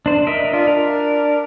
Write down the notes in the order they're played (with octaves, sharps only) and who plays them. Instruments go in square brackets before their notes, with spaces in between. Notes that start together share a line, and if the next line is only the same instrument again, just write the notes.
[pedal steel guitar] D4 C5
A#4 D#5 E5
[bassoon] D4 [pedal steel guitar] F4
[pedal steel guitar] A#4